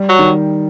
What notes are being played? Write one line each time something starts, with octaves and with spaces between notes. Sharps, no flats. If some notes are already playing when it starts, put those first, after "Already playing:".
Already playing: G3
F#3
D#3